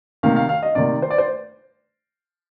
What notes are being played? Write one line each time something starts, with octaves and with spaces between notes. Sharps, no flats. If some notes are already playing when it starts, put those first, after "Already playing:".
C3 D#3 A#3 F5
F5
F5
D#5
C3 D#3 A#3 D5
C5
D5
C5